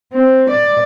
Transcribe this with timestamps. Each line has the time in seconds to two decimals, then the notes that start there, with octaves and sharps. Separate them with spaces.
0.13 C4
0.50 D5